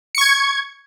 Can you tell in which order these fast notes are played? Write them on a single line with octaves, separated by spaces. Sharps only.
C#7 C#6 G#6